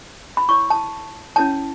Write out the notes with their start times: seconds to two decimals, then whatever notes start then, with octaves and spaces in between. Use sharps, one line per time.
0.37 B5
0.49 E4 C#5 C#6
0.70 A5
1.36 C#4 E4 C#5 A5